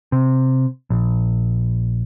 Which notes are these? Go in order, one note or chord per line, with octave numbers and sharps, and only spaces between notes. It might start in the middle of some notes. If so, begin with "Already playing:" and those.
C3
A#1